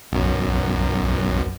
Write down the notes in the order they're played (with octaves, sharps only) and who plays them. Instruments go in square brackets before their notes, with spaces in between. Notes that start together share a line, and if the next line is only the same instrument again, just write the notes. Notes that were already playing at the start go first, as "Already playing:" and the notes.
[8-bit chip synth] B1 F#2